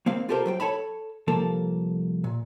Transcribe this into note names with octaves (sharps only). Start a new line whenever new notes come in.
A#3 C4 F5
F4 G4 A4 A#4 C5
F#3 C5 G5
A4 C#5 A5 B5
C2 F3 A#3 A4
A#2